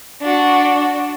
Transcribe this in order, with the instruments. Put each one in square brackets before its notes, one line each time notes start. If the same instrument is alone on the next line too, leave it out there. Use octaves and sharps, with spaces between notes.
[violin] D4 F#4